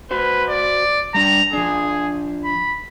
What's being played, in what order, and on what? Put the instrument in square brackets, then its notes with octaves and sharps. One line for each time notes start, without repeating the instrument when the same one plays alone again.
[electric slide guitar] F#4 C5 [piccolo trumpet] B4
[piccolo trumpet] D5
[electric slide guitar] G3 D4 [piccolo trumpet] A#5
[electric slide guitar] F3 D4 [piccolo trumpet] G#4
[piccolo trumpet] B5